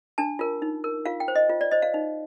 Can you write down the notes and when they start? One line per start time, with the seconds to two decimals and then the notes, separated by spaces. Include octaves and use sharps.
0.18 D4 A5
0.39 F4 A#4
0.62 D#4
0.84 A#4
1.06 F4 F5
1.20 G5
1.28 C5
1.36 D#5
1.49 F4
1.61 D5
1.72 C5 D#5
1.82 F5
1.94 D#4